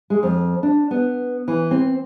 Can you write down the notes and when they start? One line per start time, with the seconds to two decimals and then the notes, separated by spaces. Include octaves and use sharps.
0.10 G#3
0.23 F2
0.63 D4
0.91 B3
1.48 E3
1.71 C4